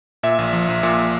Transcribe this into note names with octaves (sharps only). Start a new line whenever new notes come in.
A#2 E5
A#1
F3
A#1
A#2